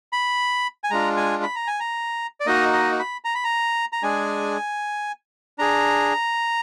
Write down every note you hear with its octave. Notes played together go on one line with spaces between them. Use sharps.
B5
G#5
G#3 D4 F4 A#5
G#5
B5
A#5
G#5
A#5
D5
A#3 D#4 F#4 D#5
D#5
B5
A#5
B5
A#5
A#5
G#3 D4 G#4 G#5
D4 G#4 A#5